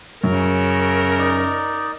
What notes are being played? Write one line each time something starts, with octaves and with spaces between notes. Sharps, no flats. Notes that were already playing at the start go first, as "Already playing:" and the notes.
F#2 C#3 A#4
D#4 D5